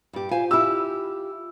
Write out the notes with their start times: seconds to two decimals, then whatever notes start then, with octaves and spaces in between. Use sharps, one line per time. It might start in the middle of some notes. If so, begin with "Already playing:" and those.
0.13 G2 G4
0.31 F4 C5 F5 G#5
0.51 E4 G4 E6